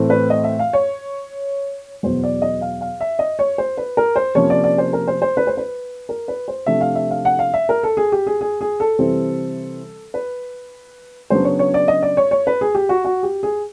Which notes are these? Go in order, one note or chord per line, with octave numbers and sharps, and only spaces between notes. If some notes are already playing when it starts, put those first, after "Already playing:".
Already playing: A2 E3 A3 C4
B4
D#5
E5
F5
C#5
E2 B2 F#3 C5
D5
D#5
F5
F5
E5
D#5
C#5
C5
B4
A#4
C5
C3 F3 A#3 C#4 C#5
D5
D5
C5
A#4
C5
C5
B4
C5
B4
A#4
B4
C5
C3 F3 A3 D4 E5
F5
E5
F5
F#5
F5
E5
A#4
A4
G#4
G4
G#4
G#4
G#4
A4
C3 E3 G3 C4
B4
C#3 F#3 B3 D4 C5
C#5
C#5
D5
D#5
D5
C#5
C#5
B4
G#4
G4
F#4
F#4
G4
G#4